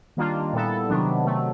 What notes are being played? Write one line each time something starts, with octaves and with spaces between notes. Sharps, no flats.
D#3 G3 A#3 D4 F4
A#2 G3 B3 E4 A4
C3 D#3 F#3 B3 D4
C3 D#3 F#3 A3